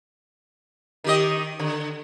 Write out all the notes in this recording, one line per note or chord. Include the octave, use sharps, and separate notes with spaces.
D#3 G4 D#5
D3